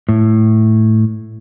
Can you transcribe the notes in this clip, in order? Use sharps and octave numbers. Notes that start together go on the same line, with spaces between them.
A2